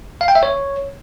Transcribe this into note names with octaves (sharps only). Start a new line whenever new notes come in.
F5
G5
E5
C#5